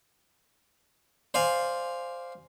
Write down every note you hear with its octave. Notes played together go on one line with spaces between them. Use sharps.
C5 D5 F5 G#5